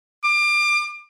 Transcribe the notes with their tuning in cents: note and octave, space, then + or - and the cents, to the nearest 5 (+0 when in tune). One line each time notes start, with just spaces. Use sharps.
D6 +30